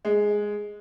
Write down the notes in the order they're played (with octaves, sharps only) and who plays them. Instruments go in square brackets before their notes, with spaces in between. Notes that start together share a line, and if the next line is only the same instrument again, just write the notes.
[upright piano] G#3